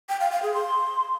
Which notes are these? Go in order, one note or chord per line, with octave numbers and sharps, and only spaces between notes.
G5
F5
F5
G#4
C6